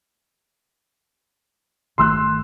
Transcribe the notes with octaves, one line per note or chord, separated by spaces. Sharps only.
G1 D#3 A3 C6 E6 F#6